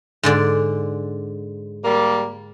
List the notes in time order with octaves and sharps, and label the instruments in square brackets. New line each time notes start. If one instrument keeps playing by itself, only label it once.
[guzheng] G#2 D3 D5
[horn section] G3 A#3